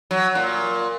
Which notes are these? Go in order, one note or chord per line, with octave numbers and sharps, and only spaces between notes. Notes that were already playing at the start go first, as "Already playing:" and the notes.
F#3
A#2